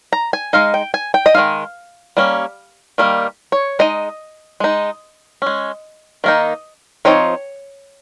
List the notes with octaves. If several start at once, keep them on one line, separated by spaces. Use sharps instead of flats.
A#5
G#5
G#3 D#4 F5
G5
G#5
G5
D#5
D#3 G#3 D#4 F5
G3 A#3 C#4
D#3 G3 A#3
C#5
G#3 D#4 D#5
G#3 D#4
G#3 C#4
D#3 A#3 D#4
F3 C4 D#4 C#5